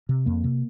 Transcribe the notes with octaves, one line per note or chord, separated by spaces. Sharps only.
C3
F2 A#3
C3